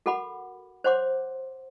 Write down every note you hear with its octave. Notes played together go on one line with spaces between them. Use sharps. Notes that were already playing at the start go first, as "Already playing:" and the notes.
F#4 A4 A#4 F#5 B5 D6
C5 C#5 F#5 C6 D6